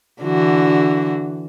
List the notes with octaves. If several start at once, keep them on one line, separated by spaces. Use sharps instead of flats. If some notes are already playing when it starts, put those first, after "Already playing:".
D3 E3 F#4